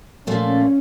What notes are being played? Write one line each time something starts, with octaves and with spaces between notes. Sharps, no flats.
A#2 F3 A3 C#4